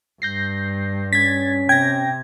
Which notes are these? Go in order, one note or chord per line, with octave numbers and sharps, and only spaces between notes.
G2 G6 A#6 C7
C#4 G#6 A6 B6
C3 G5 G#6 A#6